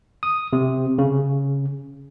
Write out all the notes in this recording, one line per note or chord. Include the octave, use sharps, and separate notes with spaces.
D#6
C3
C#3